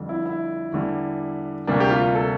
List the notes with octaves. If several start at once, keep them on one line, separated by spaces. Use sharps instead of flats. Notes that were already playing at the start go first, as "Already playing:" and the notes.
Already playing: F2 D3 G3
E4
E4
E2 D3 G3
D2 C3 G3 A#3 D4
G4
F4
A4